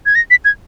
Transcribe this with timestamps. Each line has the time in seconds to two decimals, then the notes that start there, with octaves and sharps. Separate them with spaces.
0.06 G#6
0.15 A#6
0.31 B6
0.45 G#6